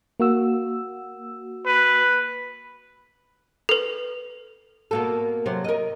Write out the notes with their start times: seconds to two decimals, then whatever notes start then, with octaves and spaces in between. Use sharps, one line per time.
0.20 A#3 F#4 E6
1.66 B4
3.69 A4 B4
4.91 B2 A#3 A4
5.46 C3 F#3 C5
5.64 A#4 D#5